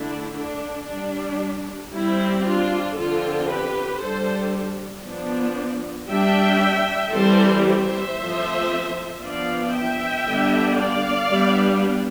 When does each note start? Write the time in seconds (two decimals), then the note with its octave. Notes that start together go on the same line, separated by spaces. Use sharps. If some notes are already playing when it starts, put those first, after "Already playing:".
Already playing: D3 A3 D4 E4
0.36 D4
0.88 G3 D4
1.92 G3 C4 E4
2.44 D4 F4
2.96 D3 F3 C4 F4 A4
3.49 G4 B4
4.00 G3 D4 A4 C5
5.05 F3 B3 D4
6.09 G3 D4 E5 G5
7.13 E3 G3 C4 A4 C5
7.65 C5 E5
8.18 F3 A3 C4
9.22 F3 B3 D4 D5 F5
9.73 E5 G5
10.26 D3 G3 B3 D4
10.78 D5 F5
11.30 G3 B3 D4